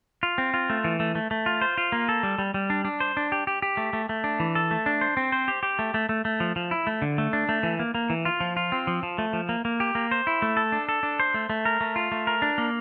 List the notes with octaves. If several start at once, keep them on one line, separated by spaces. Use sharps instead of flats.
F4
C4
F4
A3
E3
A3
A3
A3
F4
C5
F4
A#3
A4
G3
G3
G3
D4
D4
C5
D4
G4
G4
G4
A3
A3
A3
D4
E3
A4
A3
D4
C5
C4
C5
G4
G4
A3
A3
A3
A3
F3
F3
E4
A3
D3
A3
D4
A3
E3
A#3
A#3
E3
F4
F3
F4
C4
F3
F3
A3
F3
A#3
A#3
G4
A#3
C5
E4
A3
A4
D4
A4
D4
C5
A3
A3
A#4
A3
F4
A3
A#4
D4
A#3